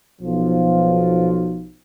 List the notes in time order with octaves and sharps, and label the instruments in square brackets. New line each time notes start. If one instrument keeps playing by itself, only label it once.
[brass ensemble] B1 F3